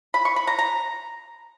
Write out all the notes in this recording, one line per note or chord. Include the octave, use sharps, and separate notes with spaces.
B5
C#6
B5
A#5
A#5